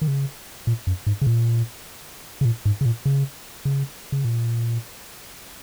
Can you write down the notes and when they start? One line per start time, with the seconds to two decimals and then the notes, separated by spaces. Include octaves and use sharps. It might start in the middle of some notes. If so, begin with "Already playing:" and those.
0.02 D#3
0.08 C#3
0.67 A#2
0.87 F#2
1.07 G#2
1.22 C#3
1.27 A#2
2.41 C#3
2.45 A#2
2.66 G#2
2.81 C#3
2.85 A#2
3.06 C#3
3.65 C#3
4.12 C#3
4.25 A#2